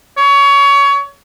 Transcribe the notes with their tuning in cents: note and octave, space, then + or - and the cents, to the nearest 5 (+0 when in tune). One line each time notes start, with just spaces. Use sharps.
C#5 +25